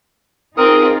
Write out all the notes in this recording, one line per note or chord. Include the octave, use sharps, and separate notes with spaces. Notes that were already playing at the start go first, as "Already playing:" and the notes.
C4 D#4 F4 G#4 A#4 D#6